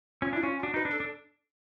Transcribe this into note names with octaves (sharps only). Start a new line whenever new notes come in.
C#4 F4
D4 E4
C#4 F4
F4
D4 F#4
D#4 B4
D4
A4
D4